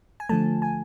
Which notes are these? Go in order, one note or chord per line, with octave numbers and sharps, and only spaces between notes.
G#5
D3 F3 A3 A5
G#5